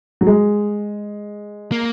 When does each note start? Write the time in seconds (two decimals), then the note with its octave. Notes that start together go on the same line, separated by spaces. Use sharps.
0.21 F#3
0.27 G#3
1.72 A#3